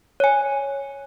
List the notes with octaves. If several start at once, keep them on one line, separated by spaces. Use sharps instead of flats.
C#5 G#5